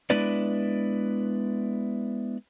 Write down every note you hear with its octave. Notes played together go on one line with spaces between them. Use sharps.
G#3 B3 D4 E4 B4 D5